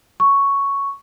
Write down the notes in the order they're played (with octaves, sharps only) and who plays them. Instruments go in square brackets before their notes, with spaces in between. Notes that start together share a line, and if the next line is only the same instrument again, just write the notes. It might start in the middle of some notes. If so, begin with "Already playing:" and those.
[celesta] C#6